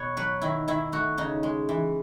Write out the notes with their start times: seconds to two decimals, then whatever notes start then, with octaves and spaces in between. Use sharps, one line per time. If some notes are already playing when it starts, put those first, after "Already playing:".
Already playing: B2 B3 C#5
0.17 F#3 B4
0.41 D#3 E4
0.68 D#3 E4
0.92 A3 F#4
1.18 C#3 D#4
1.43 G#3
1.69 E3